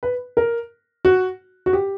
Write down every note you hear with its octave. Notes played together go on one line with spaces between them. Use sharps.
B4
A#4
F#4
F#4
G4